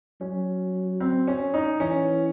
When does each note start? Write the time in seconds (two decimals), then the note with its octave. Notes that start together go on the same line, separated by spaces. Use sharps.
0.21 F#3 C#4
1.00 C4
1.28 C#4
1.54 D#4
1.80 E3 C#4